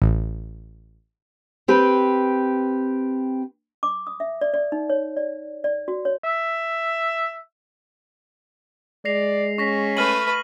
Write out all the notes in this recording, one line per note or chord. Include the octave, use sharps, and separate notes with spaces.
A1
C4 G4 B4
D6
D#6
E5
D5
D5
D#4
C#5
D5
D5
F#4
C#5
E5
G#3 D5 A#6 C7 F7
C#4 C#6 A#6 B6
A3 B4 F6 D#7 F#7